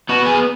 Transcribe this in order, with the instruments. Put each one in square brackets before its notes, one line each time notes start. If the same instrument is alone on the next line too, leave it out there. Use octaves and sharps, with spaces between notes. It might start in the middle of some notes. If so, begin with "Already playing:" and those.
[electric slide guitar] B3 F#4
G#4